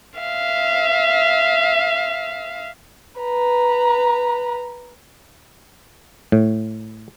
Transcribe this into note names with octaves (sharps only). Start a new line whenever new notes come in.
E5 F5
B4 A#5
A2